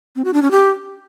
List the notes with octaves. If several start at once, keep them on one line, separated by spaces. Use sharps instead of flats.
C4
F#4
D4
C#4
G4